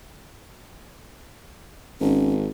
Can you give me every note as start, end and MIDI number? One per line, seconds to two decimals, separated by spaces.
2.01 2.48 32
2.01 2.33 61